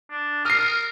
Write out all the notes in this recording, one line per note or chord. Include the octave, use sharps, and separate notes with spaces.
D4
A#4 D#6 F6 C7